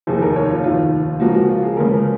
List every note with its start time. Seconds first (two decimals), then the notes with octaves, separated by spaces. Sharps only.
0.07 F1 D#2 D#3 G#4
0.22 A#4
0.36 C#5
0.50 F4
0.64 F1 D#2 D#3 F4
1.20 C#2 C#3 F3 A#3 F#4
1.34 F#4
1.49 F4
1.63 G#4
1.77 C#2 C#3 F3 A#3 A#4